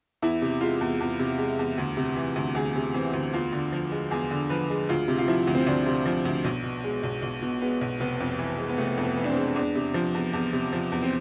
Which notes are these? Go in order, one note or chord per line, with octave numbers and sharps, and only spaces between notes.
E2 E4
C3
G#3 F4
E2
E2
C3
G#3
E2
D2
C3
E3
D2
D2 G#4
C3
E3 C4
D2
E2 F4
D3
F3
G#3
E2 G#4
D3
F3 B4
G#3
D2 F4
C3
F4
F3 E4
D2
C4
D2 D4
C3
F3
D2
B1
B2
G#3
B1
B1
B2
G#3 B3
B1
F1 B3
F2
E3
G#3
B3
F1 A3
F2
B3
E3
D4
C4
G#3
E2 D4
C3
F3
E2
E2
C3
F3
E2
C4